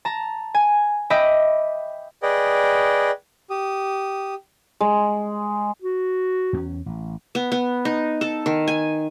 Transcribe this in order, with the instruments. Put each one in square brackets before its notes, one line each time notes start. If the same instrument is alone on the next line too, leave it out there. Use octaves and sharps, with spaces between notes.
[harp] A5 A#5
G#5
D#5 E5 G5 B5 D6 D#6
[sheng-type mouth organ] G#4 B4 D5 D#5 G5
G4 D#6
[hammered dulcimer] G#3
[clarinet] F#4
[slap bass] E2 C4 C#4
A1
[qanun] B3
B3
D#4
A4
D#3
G#5